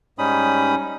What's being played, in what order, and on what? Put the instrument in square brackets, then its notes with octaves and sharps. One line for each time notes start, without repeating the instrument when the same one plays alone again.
[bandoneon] G#2 G3 C#4 D#4 B5 D#6